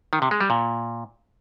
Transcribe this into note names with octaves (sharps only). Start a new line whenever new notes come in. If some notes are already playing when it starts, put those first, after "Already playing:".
D#3
C3
G#3
G3
A#2